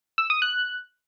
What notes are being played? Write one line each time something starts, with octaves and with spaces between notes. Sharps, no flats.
E6
D#6
F#6